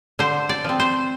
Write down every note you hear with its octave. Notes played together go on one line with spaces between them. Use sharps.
D3 C5
D5
F3 C4
C5